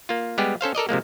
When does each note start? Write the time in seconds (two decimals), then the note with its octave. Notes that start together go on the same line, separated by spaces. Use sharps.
0.09 A#3 F4
0.38 G3 G#3 B3 G4 G#4
0.61 C#4 A4 C5 F5
0.75 A4 A#4 D5 D#5
0.89 C3 F3 G#3 A#3